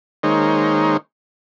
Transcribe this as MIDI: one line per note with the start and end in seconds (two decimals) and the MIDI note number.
0.23 0.97 51
0.23 0.97 56
0.23 0.97 58
0.23 0.97 63
0.23 0.97 72
0.23 0.97 73